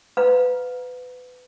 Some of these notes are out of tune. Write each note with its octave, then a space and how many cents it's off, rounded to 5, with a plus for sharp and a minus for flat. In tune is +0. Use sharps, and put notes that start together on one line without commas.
B4 +25 F5 +40 A#5 +25